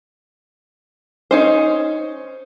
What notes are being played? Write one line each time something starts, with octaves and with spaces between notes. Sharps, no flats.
C#4 D#4 C5